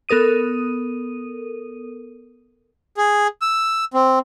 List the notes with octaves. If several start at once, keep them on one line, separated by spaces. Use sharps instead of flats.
B3 A4 A#4 D#6 D#7
G#4
E6
C4